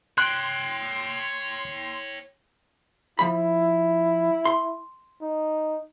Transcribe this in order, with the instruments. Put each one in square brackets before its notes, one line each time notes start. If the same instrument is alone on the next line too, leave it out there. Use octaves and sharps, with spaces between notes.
[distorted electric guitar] C#5 G5 [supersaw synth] C6 [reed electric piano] F#6
[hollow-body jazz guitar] F3 B5 [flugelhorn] E4
[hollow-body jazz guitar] C6
[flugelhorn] D#4